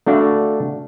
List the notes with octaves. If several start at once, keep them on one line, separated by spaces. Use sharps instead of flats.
A3 D4 F#4 F5